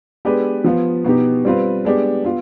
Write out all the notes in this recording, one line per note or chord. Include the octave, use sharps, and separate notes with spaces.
G#3 B3 D4 G4 B4
F3 B3 F4
B2 B3 D#4 G4
G3 C4 F4 B4
G#3 B3 D4 G4
B3 F4